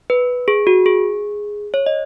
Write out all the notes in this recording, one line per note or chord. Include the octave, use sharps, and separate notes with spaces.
B4
G#4
F#4
G#4
C#5
D#5